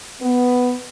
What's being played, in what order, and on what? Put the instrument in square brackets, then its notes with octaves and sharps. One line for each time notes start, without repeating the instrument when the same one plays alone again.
[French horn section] B3